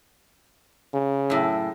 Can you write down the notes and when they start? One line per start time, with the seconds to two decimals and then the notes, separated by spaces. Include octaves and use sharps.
0.94 C#3
1.30 F#2 A2